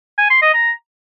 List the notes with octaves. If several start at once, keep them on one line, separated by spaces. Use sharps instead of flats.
G#5
C6
D#5
A#5